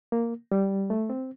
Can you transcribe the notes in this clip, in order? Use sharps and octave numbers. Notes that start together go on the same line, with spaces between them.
A#3
G3
A3
C4